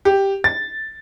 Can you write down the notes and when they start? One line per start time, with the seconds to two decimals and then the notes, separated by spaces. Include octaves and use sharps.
0.05 G4
0.44 A6